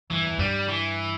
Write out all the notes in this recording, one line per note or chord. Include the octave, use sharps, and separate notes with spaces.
G2 E3
E2
G2 G3
E3